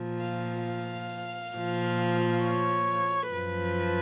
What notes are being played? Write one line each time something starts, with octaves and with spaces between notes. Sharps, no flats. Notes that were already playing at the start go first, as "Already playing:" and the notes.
Already playing: A#2 F3
F5
F5
A#2 F3
C#5
F#2 F3 B4